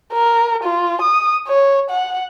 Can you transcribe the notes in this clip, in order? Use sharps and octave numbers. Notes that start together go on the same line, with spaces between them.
A#4
F4
D#6
C#5
F#5